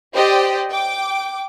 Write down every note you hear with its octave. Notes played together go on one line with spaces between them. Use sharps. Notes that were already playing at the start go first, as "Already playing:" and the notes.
G4 C5 D5 D#5 G5
G5 D6